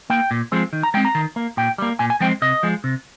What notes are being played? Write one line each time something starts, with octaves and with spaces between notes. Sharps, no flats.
A#3 G5
A#2
F3 G#3 C4
D#3
A#5
G#3 C4 G5
A#5
D#3
A#3
A#2 G5
G3 A#3
A#2 G#5
G#5
F3 G#3 C4 G5
C3 D#5
F3 G#3
C3